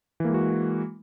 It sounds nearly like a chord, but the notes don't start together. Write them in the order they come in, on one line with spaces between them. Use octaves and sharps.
E3 A#3 G#3 F#4